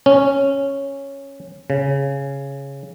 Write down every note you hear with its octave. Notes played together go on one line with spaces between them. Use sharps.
C#4
C#3